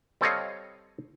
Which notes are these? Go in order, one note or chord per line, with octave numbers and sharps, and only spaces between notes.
G3 C4 A4 C#5 D#5 F5